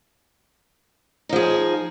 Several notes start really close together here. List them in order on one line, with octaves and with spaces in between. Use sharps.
D#4 F3 G#4